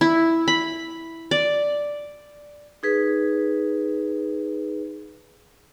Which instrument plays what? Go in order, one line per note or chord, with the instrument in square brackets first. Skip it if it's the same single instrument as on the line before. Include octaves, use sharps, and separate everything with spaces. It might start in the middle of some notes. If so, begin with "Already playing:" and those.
[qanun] E4
B5
D5
[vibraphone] D#4 G#4 B4